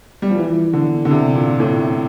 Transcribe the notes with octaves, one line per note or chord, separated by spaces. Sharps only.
G3
F3
E3
D3
D3
C3
A#2
A2